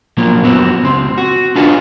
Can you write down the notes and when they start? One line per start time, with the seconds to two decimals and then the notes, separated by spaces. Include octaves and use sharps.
0.17 A#2 F3 F#3 A#3
0.44 F#2 B3 C4 F#4
0.84 C#2 C4
1.18 F#4
1.56 D4 D#4 F4 G#4 B4 C#5